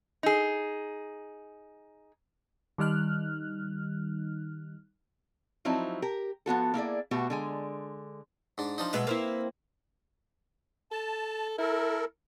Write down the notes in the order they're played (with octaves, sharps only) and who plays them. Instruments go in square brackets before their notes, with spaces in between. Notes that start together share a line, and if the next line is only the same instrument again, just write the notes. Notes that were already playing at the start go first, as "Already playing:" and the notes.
[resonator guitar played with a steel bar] D#4 G#4
[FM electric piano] D#3 G3 D#4 F6 F#6
[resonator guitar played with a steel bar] F3 F#3 C4 D#4 E4
G4 A#4
F3 B3 F#4 A4
A#3 E4 G#4 D5
B2 A3 B3 F#4 G4
D3 G#3 G#5
[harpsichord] G#2 D4
F3 D4 D#4
[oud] B2 F#3 G#3 [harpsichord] B4 E5
[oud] A#3 C4 E4
[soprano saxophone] A4 [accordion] A5
[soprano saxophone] E4 [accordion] A4 A#4